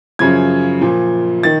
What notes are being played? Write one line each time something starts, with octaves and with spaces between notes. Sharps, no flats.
F#2 C#3 F3 G#6
A#2 F3
D#3 A6